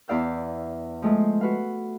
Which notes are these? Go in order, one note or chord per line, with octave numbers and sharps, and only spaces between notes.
E2 E4 D5 F5 E6 G6
F3 G#3 A3
F#4 B4 F5